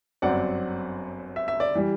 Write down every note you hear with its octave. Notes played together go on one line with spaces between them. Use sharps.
G1 F#2 F#3 C4 D5 F#5
E5
E5
D5
E3 G3